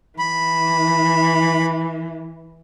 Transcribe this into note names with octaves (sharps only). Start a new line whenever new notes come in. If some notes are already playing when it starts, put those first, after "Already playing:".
E3 B5